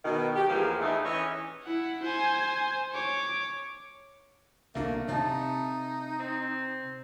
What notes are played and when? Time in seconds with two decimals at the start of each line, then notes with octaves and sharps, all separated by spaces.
0.05 B2 D#3
0.35 G4
0.49 E2 G#2 F3 A#3 B3 F4
0.81 E2 A3 D#4
1.04 E3 C#4 D#5
1.64 E4 F#5
2.03 C5 G#5
2.92 C#5 D6
4.75 C2 B2 A3 A#3 D4 E5 F5
5.08 C3 D#4 C#5 D#5 A5
6.19 C4